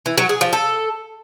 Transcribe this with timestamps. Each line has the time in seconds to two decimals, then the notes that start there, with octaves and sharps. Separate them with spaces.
0.06 E3
0.18 F#3
0.29 G#4
0.41 F3
0.53 A4